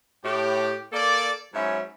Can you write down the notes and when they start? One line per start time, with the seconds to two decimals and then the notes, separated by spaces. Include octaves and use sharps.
0.24 A2 G4
0.92 A#3 A4 D5
1.54 G#2 F#3 C#4 E5 G#5 B5